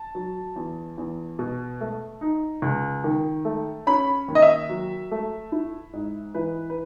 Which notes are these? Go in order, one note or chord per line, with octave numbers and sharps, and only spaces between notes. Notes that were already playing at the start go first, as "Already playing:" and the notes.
Already playing: A5
F#3
E2
E2
B2
A3
D#4
C#2
D#3
A3
C#4 B5
D#2
D#5
E5
F#3
A3
E4
G#2
E3 B4
B4